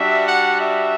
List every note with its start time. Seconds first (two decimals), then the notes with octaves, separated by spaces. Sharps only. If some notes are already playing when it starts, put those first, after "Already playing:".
Already playing: G3 D4 F#4 E5
0.25 F#5
0.58 E5